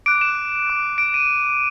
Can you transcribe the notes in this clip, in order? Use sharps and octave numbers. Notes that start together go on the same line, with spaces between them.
D6 F#6 D7
E7
D6 F#6
D7
D#7